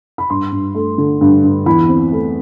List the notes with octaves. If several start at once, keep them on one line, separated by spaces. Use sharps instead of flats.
B5
G2 C6
G2
A3
D3
G2
G2
E2 B5
C4
A3